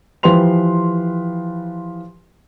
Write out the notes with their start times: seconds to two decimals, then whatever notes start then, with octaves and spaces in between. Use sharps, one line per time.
0.23 E3 F3 G4 B4 C6 F7